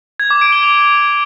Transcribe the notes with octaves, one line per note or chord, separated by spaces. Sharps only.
G#6
D6
D7
G7
F7